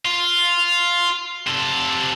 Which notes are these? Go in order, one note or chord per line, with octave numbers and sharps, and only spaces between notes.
F4
C3 A4